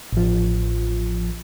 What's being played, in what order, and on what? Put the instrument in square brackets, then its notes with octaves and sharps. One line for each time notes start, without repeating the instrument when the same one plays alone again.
[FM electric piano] A1 F3